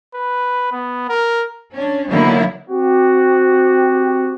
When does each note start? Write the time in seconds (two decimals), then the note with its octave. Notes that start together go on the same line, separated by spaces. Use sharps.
0.14 B4
0.72 B3
1.09 A#4
1.74 C#4 D4
2.09 D3 D#3 F#3 A#3 B3 E4
2.70 C4 F#4 G4